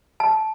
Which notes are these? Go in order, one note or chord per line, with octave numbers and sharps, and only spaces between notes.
A5